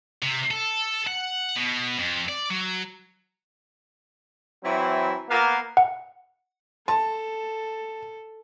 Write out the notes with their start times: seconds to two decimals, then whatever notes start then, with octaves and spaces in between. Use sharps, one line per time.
0.23 C3
0.51 A4
1.07 F#5
1.56 B2
1.98 F2
2.29 D5
2.50 F#3
4.64 E3 F#3 C4 E4
5.29 A#3 B3 F5
5.77 F#5
6.88 A4 A5